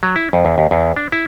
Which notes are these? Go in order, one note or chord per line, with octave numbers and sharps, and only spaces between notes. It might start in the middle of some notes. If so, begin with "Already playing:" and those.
F#3
E4
F2
E2
D#2
E2
D4
E4